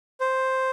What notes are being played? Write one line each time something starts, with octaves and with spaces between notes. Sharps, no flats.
C5